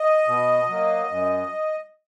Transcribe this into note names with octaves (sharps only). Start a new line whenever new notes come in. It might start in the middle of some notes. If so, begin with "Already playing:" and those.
Already playing: D#5
B2
F#3 A#3
F#2